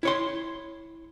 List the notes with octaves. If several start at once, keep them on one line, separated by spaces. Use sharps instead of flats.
E4 C#5 C6